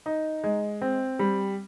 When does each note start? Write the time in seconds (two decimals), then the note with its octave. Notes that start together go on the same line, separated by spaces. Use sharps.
0.06 D#4
0.44 G#3
0.81 C4
1.19 G3